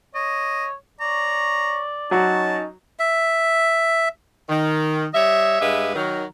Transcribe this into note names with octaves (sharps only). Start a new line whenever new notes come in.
C#5 D#5
C#5 D5 A#5 C#6
F#3 C#4 D#4 F#4 A5
E5
D#3
G3 C#5 D#5 E5
G2 G#3 G4 B4 E5 F5
D#3 F#3 A#4